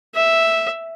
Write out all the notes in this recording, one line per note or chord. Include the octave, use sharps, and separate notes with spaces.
E5